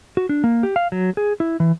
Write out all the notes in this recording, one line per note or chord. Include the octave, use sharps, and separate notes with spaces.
F#4
D4
A#3
G4
F5
F#3
G#4
E4
E3